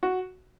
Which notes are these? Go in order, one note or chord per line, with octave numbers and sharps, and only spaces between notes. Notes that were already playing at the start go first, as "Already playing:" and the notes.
F#4